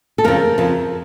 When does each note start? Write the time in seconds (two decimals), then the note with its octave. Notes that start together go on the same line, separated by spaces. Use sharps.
0.18 A4
0.24 F2 C#3 F3 A#4
0.58 F2 C#3 F3